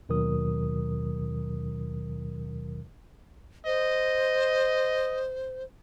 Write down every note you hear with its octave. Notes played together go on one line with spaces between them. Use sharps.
D#2 B2 D#3 F#3 A#4 D#6
C5 D#5